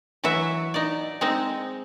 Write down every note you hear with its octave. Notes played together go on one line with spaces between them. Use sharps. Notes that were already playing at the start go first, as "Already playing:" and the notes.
E3 F#3 F#4 E5
D#4 D5
G#3 C4 D#4